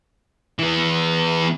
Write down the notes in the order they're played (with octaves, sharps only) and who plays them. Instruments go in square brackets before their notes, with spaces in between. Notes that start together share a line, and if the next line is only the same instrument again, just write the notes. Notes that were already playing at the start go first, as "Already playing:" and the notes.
[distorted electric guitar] E3 B3